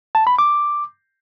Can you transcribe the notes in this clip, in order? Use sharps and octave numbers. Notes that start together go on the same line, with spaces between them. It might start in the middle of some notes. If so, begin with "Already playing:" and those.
A5
B5
D6